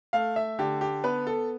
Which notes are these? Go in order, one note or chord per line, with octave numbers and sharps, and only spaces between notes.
A3 F5
E5
D3 G4
G4
B3 B4
A4